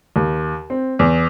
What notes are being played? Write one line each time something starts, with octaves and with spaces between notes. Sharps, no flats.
D#2
C4
E2